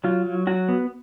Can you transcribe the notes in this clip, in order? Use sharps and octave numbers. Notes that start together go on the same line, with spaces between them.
F#3 F4
F#3
F#3 F#4
B3